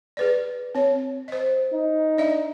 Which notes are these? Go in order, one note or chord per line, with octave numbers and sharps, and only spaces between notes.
G#4 B4 D5
C4 C#5
C5 D#5
D#4
D4 D5 E5